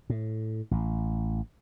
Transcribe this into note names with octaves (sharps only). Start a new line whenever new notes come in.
A2
A1